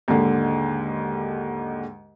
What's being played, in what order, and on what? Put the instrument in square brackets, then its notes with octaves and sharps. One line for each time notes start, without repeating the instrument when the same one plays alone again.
[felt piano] D#2 G#2 D3